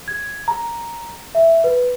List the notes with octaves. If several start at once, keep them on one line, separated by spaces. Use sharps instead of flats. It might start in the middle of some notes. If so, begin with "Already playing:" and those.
G#6
A#5
E5
B4